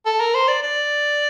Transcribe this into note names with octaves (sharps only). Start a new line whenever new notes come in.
A4
A#4
C5
D5
D5